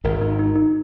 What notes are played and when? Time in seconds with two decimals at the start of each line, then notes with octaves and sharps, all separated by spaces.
0.04 G#1 G#2 A#4
0.21 D#4
0.39 D#4
0.56 D#4